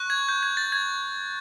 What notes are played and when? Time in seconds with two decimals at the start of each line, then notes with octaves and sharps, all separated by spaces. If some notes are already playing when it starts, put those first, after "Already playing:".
Already playing: C#6 F#6
0.10 G#6
0.29 G6
0.43 G#6
0.57 A6
0.72 G#6